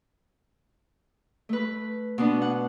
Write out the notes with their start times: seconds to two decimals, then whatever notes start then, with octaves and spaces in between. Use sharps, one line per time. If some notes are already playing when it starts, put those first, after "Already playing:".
1.49 A3 B4
2.18 B2 B3 D4
2.42 F#5